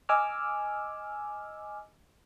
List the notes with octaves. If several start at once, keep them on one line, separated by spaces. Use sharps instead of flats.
D#5 G#5 D6 E6 F6